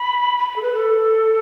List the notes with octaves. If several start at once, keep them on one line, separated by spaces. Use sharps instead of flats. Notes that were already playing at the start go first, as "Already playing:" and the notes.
Already playing: B5
B5
B5
A4
B4
A4